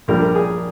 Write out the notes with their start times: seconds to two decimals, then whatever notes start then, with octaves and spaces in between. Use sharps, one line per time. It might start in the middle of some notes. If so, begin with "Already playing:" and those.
0.08 A#1 A#2 G3 D4 A#4
0.22 A#4
0.35 G#4